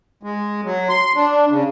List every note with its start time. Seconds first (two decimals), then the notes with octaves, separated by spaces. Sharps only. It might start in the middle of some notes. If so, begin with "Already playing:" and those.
0.23 G#3
0.64 F#3
0.89 C6
1.16 D4
1.50 C#3